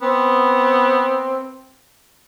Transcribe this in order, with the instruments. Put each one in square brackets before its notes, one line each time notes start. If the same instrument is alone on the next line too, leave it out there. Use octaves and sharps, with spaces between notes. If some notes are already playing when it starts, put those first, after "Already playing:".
[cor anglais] B3 [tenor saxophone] C4